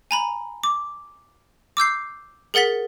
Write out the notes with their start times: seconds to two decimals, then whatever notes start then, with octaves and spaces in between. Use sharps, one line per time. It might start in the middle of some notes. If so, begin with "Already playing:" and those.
0.11 G#5 A#5 B5
0.63 D6
1.77 D6 E6 G6 C7
2.54 G#4 A#4 F#5 A6 B6